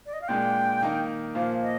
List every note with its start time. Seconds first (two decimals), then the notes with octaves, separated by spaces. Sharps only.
0.06 D5
0.13 D#5
0.22 F5
0.28 A#2 G#3 D4 G5
0.82 D#3 A#3 D#4
1.35 A#2 F3 A#3 F5
1.62 D#5